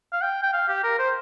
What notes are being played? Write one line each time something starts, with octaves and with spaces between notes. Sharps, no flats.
F5
G5
G5
F5
G4
A#4
C5